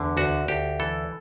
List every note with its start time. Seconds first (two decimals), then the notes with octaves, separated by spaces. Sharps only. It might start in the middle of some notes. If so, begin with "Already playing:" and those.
Already playing: E2 D3
0.17 D2 F#4
0.48 D2 G4
0.80 E3 A4